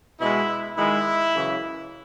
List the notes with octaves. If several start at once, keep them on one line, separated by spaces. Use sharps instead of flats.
B2 G#3 B3 E4
D#3 G#3 B3 E4
F#2 C#3 E3